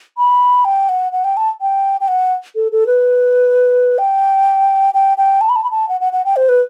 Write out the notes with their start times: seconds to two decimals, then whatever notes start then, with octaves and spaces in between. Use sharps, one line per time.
0.18 B5
0.65 G5
0.89 F#5
1.12 F#5
1.24 G5
1.37 A5
1.61 G5
2.01 G5
2.08 F#5
2.56 A4
2.72 A4
2.87 B4
3.98 G5
4.94 G5
5.18 G5
5.41 A5
5.49 B5
5.56 A5
5.64 B5
5.71 A5
5.89 F#5
6.01 F#5
6.13 F#5
6.25 G5
6.36 C5
6.49 B4